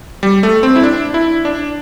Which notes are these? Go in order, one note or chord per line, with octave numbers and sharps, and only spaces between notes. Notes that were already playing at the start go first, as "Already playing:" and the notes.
G3
A3
C4
E4
D4
E4
D4